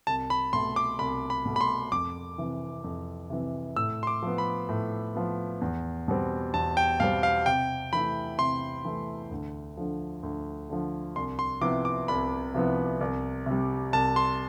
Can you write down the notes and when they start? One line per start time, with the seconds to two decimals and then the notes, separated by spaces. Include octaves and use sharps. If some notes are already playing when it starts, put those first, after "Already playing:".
0.07 C2 A5
0.30 B5
0.53 B2 A3 C6
0.76 D6
0.99 C2 B5
1.30 B5
1.45 B2 A3
1.56 B5
1.61 C6
1.92 F2 D6
2.38 C3 E3
2.84 F2
3.30 C3 E3
3.76 A2 E6
4.03 C6
4.07 D6
4.23 F3 B3
4.38 B5
4.69 A2
5.15 F3 B3
5.61 E2
6.08 B2 G3 C4
6.54 E2 A5
6.77 G5
7.00 B2 G3 C4 F5
7.23 F5
7.46 C3 G5
7.93 E3 A3 E4 B5
8.38 C3 C6
8.85 E3 A3 E4
9.31 D2
9.77 D3 F3
10.23 D2
10.70 D3 F3
11.16 C2 C6
11.39 C6
11.61 C3 F3 B3 E4 D6
11.85 D6
12.08 C2 B5
12.54 C3 F3 B3 E4
13.01 C2
13.46 C3 G3
13.93 C2 A5
14.16 C6